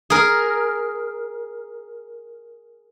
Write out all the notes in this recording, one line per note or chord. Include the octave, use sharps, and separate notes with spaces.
G#4 A#4